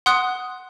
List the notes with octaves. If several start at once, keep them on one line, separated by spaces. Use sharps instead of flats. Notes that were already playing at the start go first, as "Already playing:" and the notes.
F#5 C6 D#6 F#6